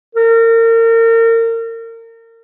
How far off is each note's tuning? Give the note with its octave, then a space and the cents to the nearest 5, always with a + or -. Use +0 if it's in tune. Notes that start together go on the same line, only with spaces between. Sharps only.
A#4 -35